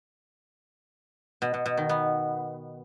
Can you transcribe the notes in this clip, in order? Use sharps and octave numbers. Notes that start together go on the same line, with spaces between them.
B2
B2
B2
D#3
B3